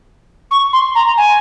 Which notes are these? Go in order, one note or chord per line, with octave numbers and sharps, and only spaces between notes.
C#6
C6
A#5
G#5